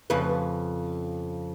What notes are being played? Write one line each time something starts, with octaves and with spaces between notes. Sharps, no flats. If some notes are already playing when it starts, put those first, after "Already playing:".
F2 C#3 B4